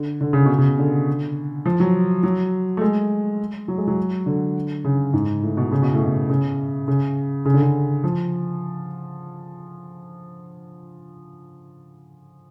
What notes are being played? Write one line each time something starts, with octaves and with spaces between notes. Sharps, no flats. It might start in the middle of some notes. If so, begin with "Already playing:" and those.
Already playing: D3
D3
C#3
B2
C#3
D3
F3
F#3
F#3
A3
G#3
F#3
G#3
F#3
D3
C#3
G#2
A2
B2
C#3
B2
A2
B2
C#3
C#3
C#3
D3
C#3
F3